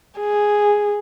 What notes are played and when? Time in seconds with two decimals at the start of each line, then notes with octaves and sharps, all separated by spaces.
0.19 G#4